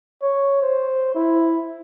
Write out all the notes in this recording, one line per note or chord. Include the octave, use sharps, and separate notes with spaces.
C#5
C5
E4